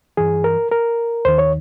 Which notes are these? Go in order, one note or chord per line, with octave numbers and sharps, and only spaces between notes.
G2 E3 G#4
A#4
A#4
D#2 D#3 C5
C#5